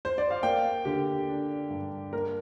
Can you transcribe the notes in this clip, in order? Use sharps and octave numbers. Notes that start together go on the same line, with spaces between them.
C5
D5
F5
A#3 G5
D3 G4
D4
G2
A#3 A#4